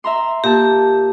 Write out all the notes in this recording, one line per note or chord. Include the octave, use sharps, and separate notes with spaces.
E5 A#5 C6
A#2 G4 A5